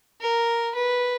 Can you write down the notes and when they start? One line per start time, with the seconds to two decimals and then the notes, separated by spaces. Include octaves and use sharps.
0.21 A#4
0.75 B4